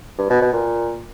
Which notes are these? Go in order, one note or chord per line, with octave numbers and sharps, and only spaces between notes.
G2
B2
B2
A#2